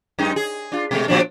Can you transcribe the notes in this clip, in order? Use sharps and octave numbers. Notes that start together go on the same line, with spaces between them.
F#2 G#3 D#4
G#4
D4 F4
B2 G#3 A3
A#2 F3 D4